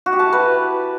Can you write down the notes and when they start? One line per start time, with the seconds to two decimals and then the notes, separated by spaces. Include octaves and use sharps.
0.06 F#4
0.13 G4
0.19 A5
0.26 E4
0.33 B4